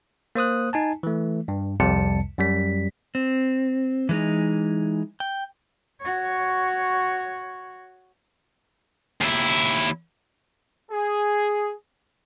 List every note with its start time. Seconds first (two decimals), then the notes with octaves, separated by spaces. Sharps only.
0.35 A#3 C5 D#6 F#6
0.73 D#4 G#5 A5
1.03 E3 A3
1.48 G2
1.80 C2 F2 C3 G3 A5 C#7
2.38 F#2 G3 B6
3.15 C4
4.09 E3 G#3 D#4
5.20 G5
6.01 F#4 C#5
9.21 D#2 E4
10.92 G#4